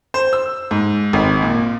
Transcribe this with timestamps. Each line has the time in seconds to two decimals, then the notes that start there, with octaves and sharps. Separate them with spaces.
0.14 C5
0.33 E6
0.71 G#2
1.13 G#1
1.42 A#2